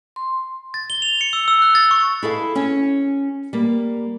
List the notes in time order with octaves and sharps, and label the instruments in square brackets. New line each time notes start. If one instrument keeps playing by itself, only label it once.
[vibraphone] C6
[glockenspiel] A6
G7
F7
C#7
E6
E6
F#6
A6
C#6
[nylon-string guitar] E4 G#4 A4 F5
C#4 C#5
G3 A#3